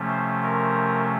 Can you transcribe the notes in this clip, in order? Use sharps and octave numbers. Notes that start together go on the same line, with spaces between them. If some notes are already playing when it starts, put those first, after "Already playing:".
Already playing: C3 F3 A3 C#4
C5
A#4